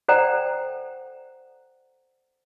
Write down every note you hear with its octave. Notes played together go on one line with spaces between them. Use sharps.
A4 C5 D5 F#5 G5 A#5